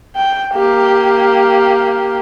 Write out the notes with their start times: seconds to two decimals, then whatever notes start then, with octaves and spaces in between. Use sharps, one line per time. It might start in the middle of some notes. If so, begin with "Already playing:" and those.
0.16 G5
0.54 A#3 G4